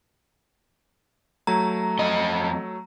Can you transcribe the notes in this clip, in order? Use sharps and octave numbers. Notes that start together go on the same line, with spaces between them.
F#3 A3 A#5
F2 D#5